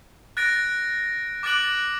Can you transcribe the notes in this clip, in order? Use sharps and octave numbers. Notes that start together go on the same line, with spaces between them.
F#6 A6 A#6 D7
D6 F#6 A6 D7 F#7